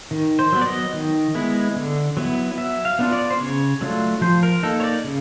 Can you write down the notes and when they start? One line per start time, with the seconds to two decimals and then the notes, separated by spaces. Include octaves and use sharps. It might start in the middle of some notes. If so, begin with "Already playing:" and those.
0.11 D#3
0.39 C5
0.52 F#3 B3
0.61 D5
0.66 D#5
0.94 D#3
1.35 G#3 B3 E4
1.76 D3
2.17 F#3 B3 E4
2.58 F#3 E5
2.85 F5
2.99 B3 D4 F4
3.12 D5
3.30 C5
3.40 C#3 C#5
3.81 F#3 A3 D4 F4
4.21 F3 C5
4.43 A#4
4.63 A#3 D#4 A4
4.80 C#5
4.84 D5
5.04 C#3